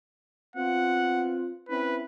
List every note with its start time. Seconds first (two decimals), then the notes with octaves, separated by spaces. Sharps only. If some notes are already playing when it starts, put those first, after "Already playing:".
0.56 B3 C4 F4 F#5
1.69 C4 C#4 E4 B4